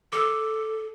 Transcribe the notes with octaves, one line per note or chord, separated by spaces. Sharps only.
A4 D6 E6